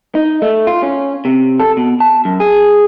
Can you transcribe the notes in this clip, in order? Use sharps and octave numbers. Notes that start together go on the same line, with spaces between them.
D#4
A3
F4
C#4
C3
A4
B2
A5
F#2
G#4